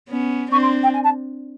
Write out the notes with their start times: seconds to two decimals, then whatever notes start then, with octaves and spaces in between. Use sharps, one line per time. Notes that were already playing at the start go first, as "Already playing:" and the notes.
0.09 B3 C#4
0.51 C4 D4 C#6
0.62 C6
0.83 G5
0.93 G#5
1.03 A5